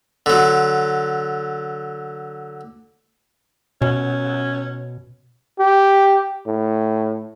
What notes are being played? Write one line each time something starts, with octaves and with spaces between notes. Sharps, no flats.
D3 F#3
B2 C#4
G4
A2